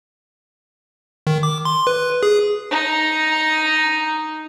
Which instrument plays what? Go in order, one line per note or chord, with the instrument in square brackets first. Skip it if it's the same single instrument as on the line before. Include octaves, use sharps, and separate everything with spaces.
[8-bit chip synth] D#3
D6
C6
B4
G#4
[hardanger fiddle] D#4 A#5